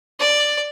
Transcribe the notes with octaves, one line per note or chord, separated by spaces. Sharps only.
D5